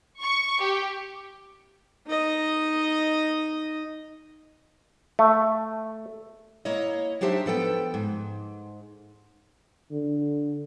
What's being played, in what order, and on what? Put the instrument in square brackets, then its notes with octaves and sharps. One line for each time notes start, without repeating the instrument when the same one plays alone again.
[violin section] C#6
G4
[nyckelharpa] D#4 D#5
[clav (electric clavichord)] A3
[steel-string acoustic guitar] A#3 E4 C#5 D#5
F#3 D4 D#4 G4 C5 E5
F3 B3 A4 G5
G#2
[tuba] D3